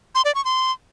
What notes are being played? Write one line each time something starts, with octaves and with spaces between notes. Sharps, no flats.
C6
D5
C#6
C6